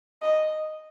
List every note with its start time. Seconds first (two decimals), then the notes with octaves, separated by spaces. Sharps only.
0.22 D#5